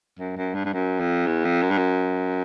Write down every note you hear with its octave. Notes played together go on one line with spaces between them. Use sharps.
F#2
F#2
G2
G2
F#2
F2
E2
F2
F#2
G2
F#2